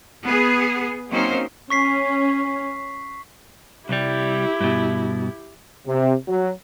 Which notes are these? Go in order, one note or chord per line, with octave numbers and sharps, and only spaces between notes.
B3 G#4
F#3 A#3 C4 C#4 D#4 C5
C#4 C#6 B6 C7
C2 G3 E4 G4
G2 B2
C3
F#3